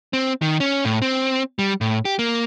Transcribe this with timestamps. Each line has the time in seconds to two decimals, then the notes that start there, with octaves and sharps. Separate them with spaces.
0.13 C4
0.42 D#3
0.60 C#4
0.85 A2
1.02 C4
1.59 G3
1.81 A2
2.05 G4
2.19 A#3